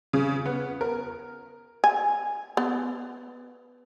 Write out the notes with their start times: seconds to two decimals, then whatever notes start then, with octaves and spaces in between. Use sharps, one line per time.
0.13 C#3
0.46 B3
0.81 A#4
1.84 G#5
2.57 B3